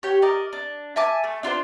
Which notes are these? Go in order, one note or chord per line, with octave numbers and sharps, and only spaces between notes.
G4 C#5
A#4 D5 D#5
D4
E5 G#5 A5 D6
A3
D4 F4 B4 C5